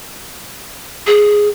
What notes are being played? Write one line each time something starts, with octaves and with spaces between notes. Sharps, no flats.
G#4